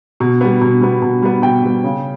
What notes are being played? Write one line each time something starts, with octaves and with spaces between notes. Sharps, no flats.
B2
G3 B3
B2
G3 B3
B2
G3 B3
B2 G5
G3 B3
C#3